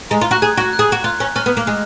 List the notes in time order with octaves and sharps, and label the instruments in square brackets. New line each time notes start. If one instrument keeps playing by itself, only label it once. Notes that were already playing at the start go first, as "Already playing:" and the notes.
[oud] G#3 [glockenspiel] A#5
[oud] F4
[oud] F#4 [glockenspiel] F#6
[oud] G#4 [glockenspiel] G#6
[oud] F#4
[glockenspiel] F#6
[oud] G#4
F#4
[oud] F4 [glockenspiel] F#6
[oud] C#4
[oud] C#4 [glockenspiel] F6
[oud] B3
A#3
[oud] G#3 [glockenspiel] F#6